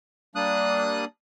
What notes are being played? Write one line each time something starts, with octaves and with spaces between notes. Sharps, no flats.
G3 A#3 D4 D#6 F#6